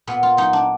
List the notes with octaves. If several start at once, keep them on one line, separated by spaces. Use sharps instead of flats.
A#2 B3
F4
F#3 D#4
D4